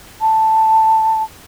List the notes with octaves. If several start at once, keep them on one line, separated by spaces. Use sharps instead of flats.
A5